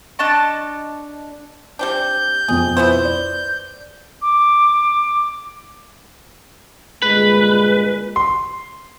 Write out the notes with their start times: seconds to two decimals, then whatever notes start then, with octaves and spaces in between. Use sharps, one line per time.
0.19 D4 D#5 A5 C#6
1.79 G3 C4 D4 G6
2.48 F2 B2 G#4
2.77 B3 E4 C5
3.05 D5
4.22 D6
7.02 G1 A#2 G#3 B4
8.16 C6